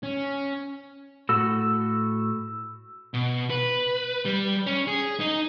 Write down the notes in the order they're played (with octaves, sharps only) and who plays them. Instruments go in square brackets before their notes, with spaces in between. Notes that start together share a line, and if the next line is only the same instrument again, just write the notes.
[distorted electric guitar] C#4
[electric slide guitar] A2 F#4 A4 [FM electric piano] E6
[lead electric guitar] B2
B4
G3
C#4
G#4
D#4